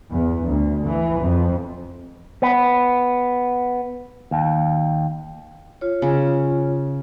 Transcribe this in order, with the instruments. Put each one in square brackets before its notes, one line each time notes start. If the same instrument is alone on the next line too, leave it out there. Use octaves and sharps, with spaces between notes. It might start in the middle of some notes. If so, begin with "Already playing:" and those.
[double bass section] E2
D2
E3
F2
[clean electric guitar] B3
D#2
[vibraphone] F4 C#5
[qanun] C#3